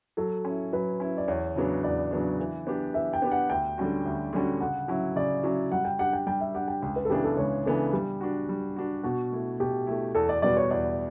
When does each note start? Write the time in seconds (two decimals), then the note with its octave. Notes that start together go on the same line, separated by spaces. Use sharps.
0.17 F#3 A4
0.45 C#4 E4
0.73 F#3 B4
1.00 C#4 E4
1.18 D5
1.28 E2 C#5
1.56 C#3 F#3 B3 D4
1.84 E2 D5
2.11 C#3 F#3 B3 D4
2.39 E3
2.67 B3 D4 G4
2.94 E3 E5
3.13 G5
3.22 B3 D4 G4
3.31 F#5
3.50 D2 G5
3.78 D3 G3 C#4 F#4
4.05 D2
4.33 D3 G3 C#4 F#4
4.61 C#3 F#5
4.88 F#3 C#4 E4
5.16 C#3 D5
5.44 F#3 C#4 E4
5.72 G3 F#5
5.85 G5
5.99 D4 G4 F#5
6.13 G5
6.27 G3 G5
6.40 E5
6.55 D4 G4 F#5
6.68 G5
6.82 C#2 G5
6.96 B4
7.05 A4
7.10 C#3 E3 B3 D4 G4
7.24 A4
7.37 C#2 C#5
7.65 C#3 E3 B3 D4 A4
7.93 G3 G4
8.21 D4 F#4
8.49 G3
8.76 D4 F#4
9.03 B2 F#4
9.32 A3 E4
9.60 B2 G4
9.87 A3 E4
10.15 E2 A4
10.29 D5
10.42 B2 G3 B3 F#4 D5
10.57 C#5
10.70 E2 D5